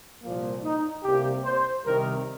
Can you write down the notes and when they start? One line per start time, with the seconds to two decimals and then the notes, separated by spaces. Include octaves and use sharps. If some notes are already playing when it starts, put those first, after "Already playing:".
0.23 C2 A#2 F3 A#3
0.64 D#4
1.04 C2 C3 G3 A#3 G4
1.45 C5
1.86 C2 C3 D#3 A#4